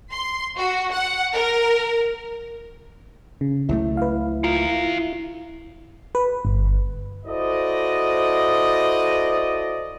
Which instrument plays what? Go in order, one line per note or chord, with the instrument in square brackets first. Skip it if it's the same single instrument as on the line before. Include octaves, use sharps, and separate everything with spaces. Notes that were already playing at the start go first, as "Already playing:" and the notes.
[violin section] C6
F#4
F#5
A#4
[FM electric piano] C#3
[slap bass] C#2 F#3 A3 [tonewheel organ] E4
[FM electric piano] B4 F5
[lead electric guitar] D#4 F5 [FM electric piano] F4
[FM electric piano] B4
G1
[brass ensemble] E4 F#4 A4 C5 D5 D#5